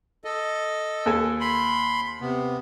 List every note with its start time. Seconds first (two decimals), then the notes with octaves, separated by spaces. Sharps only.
0.24 A4 D#5
1.06 D#2 A4 G#5
1.40 B5 C6
2.21 C3 B3